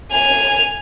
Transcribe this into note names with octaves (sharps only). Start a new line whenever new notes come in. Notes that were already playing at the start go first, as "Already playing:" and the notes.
G#5 F7